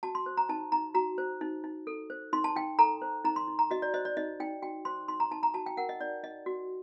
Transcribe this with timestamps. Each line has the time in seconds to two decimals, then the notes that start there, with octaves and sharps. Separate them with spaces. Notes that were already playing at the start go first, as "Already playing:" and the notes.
0.03 F#4 A5
0.15 C6
0.26 C5
0.37 A#5
0.49 D#4 A5
0.72 D#4 A#5
0.94 F#4 A#5
1.18 C5
1.41 D#4
1.64 D#4
1.87 A4
2.10 C5
2.33 D#4 C6
2.44 A5
2.56 D#4 G5
2.79 A4 A#5
3.02 C5
3.24 D#4 A#5
3.36 C6
3.48 D#4
3.59 A#5
3.71 F#4 D#5
3.82 D5
3.94 C5 D#5
4.05 D5
4.17 D#4 D#5
4.40 D#4 G5
4.62 F#4 G5
4.85 C5 C6
5.08 D#4 C6
5.20 A#5
5.31 D#4 A5
5.43 A#5
5.54 F#4 A5
5.66 G5
5.77 A#4 F#5
5.89 D#5
6.00 D#4 D5
6.23 D#4 D#5
6.46 F#4